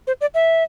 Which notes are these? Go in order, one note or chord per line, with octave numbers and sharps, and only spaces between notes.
C5
D5
E5